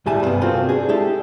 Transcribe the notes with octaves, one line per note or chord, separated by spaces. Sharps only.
D2 A2 G3 E4 G#5 A5
G2 C3 B3
A#3 C4 F4 F#4 A4
D4 G#4
G#3 E4 G4 A4